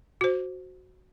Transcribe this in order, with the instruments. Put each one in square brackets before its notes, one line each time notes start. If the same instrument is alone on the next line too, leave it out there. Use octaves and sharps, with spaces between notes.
[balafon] F#4 C5